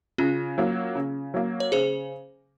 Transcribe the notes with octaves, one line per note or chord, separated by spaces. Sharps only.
C#3 C#4 F4
F#3 A#3
C#3
F#3 A#3
C#5
C#3 G#4 C5